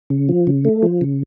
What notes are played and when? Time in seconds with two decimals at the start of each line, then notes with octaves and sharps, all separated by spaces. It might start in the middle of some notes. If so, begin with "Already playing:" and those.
0.10 C#3
0.29 F3
0.47 C#3
0.65 A3
0.83 F3
1.01 C#3